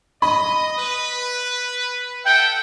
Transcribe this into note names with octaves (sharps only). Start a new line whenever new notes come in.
D#5 B5
B4
A4 E5 F#5 G5